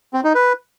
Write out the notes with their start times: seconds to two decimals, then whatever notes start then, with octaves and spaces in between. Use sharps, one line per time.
0.14 C4
0.24 D#4
0.35 B4